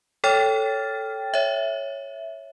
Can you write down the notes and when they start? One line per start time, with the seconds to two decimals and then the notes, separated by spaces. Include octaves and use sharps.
0.24 A4 C#5 G5 F6 A6
1.34 C#5 E5